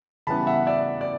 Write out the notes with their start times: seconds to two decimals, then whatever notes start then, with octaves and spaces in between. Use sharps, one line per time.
0.27 C#3 E3 G3 B3 A5 B5
0.47 E5 F#5
0.67 D5 E5
1.01 D5